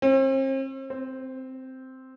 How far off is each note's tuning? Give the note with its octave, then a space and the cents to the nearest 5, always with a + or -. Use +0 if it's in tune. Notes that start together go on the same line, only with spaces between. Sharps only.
C4 +40
C4 -5